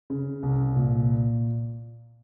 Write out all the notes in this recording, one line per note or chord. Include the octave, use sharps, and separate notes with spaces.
C#3
C2
A#2